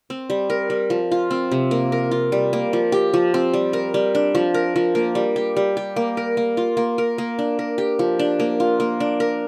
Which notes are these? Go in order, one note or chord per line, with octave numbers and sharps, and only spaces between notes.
C4
G3
A#4
G3
F3
F4
C4
C3
A#3
A#4
F4
G3
A#3
F3
G4
F3
C4
G3
A#4
G3
D4
F3
A#4
F3
A#3
G3
G4
G3
G4
A#3
A#4
A#3
F4
A#3
A#4
A#3
D4
A#4
G4
F3
D4
A#3
F4
A#3
D4
A#4